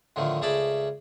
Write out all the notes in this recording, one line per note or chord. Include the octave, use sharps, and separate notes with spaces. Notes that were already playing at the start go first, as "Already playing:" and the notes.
A2 D3 D#3 F3 A3
C#2 A3 G#4 D5 A5 B5